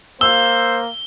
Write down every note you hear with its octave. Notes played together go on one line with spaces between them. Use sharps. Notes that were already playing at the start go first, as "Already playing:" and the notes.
A#3 C5 F5 E6 G7